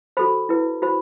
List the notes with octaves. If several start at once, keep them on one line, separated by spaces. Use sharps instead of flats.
F#4 A4 C5 B5
E4 B4
F#4 C5 B5